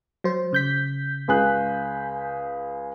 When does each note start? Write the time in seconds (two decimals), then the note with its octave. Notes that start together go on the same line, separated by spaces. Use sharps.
0.24 F#3 C5
0.53 C#3 G6 B6
1.28 C#2 G#4 F#6